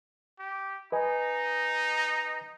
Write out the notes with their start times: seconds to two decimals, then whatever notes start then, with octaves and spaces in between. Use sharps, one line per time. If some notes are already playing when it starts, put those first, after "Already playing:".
0.39 G4
0.92 D#4 B4 D#5 G#5